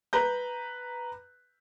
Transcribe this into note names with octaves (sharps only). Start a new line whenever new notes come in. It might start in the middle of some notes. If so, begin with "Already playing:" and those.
B4 A#5 G6